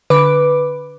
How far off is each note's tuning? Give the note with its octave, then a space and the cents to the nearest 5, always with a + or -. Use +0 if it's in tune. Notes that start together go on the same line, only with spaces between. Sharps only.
D3 -5 B4 +0 D6 +0